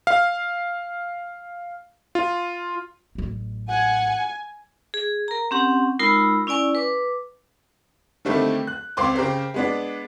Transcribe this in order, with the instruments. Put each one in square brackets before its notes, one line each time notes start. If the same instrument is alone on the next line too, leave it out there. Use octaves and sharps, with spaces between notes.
[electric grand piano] F5
F4
[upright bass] A1 F#3
[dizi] F#5 [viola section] G#5
[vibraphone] G#4
A#4 A#5
C4 C#4 G4 F#5
G#3 D#4 F4 A#4 B5 E6
C#4 E4 D5 G#5 C#6
B4 D6
[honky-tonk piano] D3 D#3 G3 A3 A#3 C4
F#6
C#2 C4 C6 D6
C#3 G4 A#4 C5
G#3 B3 D4